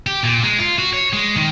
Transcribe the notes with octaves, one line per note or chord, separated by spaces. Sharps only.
G4
A#2
G#3
F4
F#4
C#5
G#3
D#3